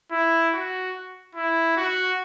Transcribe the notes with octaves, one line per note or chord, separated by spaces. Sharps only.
E4
F#4
E4
F#4